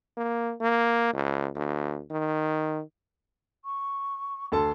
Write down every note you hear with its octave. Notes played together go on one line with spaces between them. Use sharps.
A#3
A#3
C#2
D2
D#3
C#6
D2 A4 A5 C6